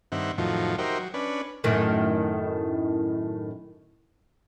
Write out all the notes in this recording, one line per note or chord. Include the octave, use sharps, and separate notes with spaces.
G2 D#3 C4 E5 F#5
F2 A2 D#3 F3 F#3
D#4 F#4 G4 A#4 C5 E5
F#3
C#4 D4 B4
F#2 A2 D#3